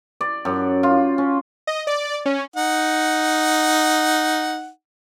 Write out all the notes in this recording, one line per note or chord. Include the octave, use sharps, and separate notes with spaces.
D5
F#2
F4
C#4
D#5
D5
C#4
D#4 F#5